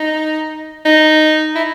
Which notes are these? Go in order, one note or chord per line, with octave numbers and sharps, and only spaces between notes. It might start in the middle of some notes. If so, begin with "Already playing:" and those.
Already playing: D#4
D#4
E4